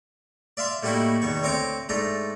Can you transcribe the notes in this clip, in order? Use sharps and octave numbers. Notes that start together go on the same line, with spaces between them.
D5 E5 F5 C6
A2 G3 A#3 D#4 E4 F#4
E2 B2 D#3 C#6
D2 C4 C#5 A#5 D6
G#2 A3 D4 A#5